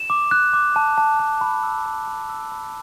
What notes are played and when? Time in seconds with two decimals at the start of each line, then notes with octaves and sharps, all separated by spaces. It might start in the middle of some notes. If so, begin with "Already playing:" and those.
Already playing: E7
0.10 D6
0.31 F#6
0.53 D6
0.76 A5
0.98 A5
1.19 A5
1.41 B5
1.63 E6
1.86 B5
2.07 B5
2.30 E6
2.52 B5